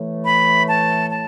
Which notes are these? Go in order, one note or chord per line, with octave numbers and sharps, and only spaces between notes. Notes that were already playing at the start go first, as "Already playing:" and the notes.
Already playing: A2 E3 A3
B5
A5
A5